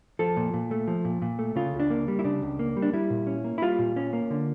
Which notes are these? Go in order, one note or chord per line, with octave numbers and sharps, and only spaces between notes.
F3 A4
A#2
A#2
A3
F3
A#2
A#2
A3
C#3 F4
C#2
D4
A#3
G3
E4
C#3 D4
C#2
A#3
G3
D4
G3 E4
A#2
C#4
A#3
E4
G3 F4
A#2
C#4
A#3
D3